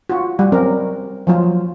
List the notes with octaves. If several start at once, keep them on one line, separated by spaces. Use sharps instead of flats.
F4 F#4
G3
F#3 C4 C#4 A#4
F3 F#3 F4